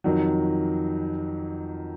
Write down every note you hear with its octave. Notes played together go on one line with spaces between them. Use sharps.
F2 D#3 F#3